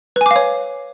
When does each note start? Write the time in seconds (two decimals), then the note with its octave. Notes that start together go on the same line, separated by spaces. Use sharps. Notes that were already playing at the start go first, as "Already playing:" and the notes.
0.16 B4
0.21 G#5
0.26 D6
0.31 F5
0.36 C#5